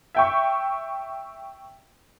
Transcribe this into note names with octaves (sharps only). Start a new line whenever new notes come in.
E5 G5 C#6